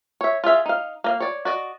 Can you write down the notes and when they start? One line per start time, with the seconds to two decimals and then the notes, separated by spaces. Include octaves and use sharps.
0.21 C#5 E5
0.44 F4 G#4 E5 F5
0.66 D#4 F5
1.04 A#3 D#5 F5
1.20 C#5 D5
1.45 F#4 D5 D#5